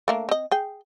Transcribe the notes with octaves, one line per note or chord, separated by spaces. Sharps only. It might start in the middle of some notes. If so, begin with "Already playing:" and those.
A3 A#3 D4
C4 D#5
G#4 G5